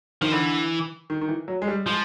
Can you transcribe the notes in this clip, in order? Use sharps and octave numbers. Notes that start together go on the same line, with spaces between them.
D#3 F3
D3 E3
D#3
D#3
E3
F#3
G#3
G3
F3 G#3